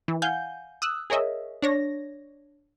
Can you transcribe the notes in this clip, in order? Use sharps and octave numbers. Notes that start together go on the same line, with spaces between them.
E3
F5 F#5 G#5 G6
D#6 E6 F#6
G#4 A#4 C#5 D#5 E5
D4 C#5 A#6